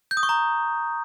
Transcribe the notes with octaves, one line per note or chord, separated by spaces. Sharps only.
G6
D#6
C#6
A#5